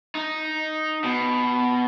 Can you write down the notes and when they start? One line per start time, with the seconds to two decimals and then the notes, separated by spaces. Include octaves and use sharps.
0.15 D#4
1.04 B2